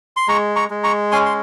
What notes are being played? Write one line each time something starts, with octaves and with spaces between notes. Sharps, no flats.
C6
G#3 A#5 C#6
A#5 C#6
G#3
A#5 C#6
C#4 G#5 C6
C6